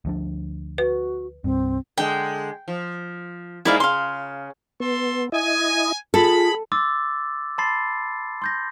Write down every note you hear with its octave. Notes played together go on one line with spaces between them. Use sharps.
D2 F3 D4
F#4 B4
C2 G2 C4
D3 G#3 G5
F3
G#2 G#3 A#3 E4 D5 F5
C#3 F5 C6
B3 A4 C6
E4 D#5 G#5
F4 G#4 A4 B5
C6 D6 E6 A6
A5 B5 C6 A6 C7
C6 G6 A#6